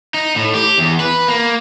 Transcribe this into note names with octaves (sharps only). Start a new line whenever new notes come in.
D#4
A2
G4
E2
B4
A#3